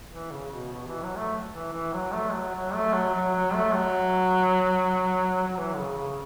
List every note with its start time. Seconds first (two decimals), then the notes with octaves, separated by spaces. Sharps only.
0.12 E3
0.32 C#3
0.52 B2
0.72 B2
0.87 E3
1.03 F#3
1.17 A3
1.53 E3
1.73 E3
1.94 F#3
2.13 A3
2.33 F#3
2.54 F#3
2.74 A3
2.93 F#3
3.14 F#3
3.35 F#3
3.54 A3
3.75 F#3
5.48 F#3
5.57 E3
5.77 C#3
5.98 C#3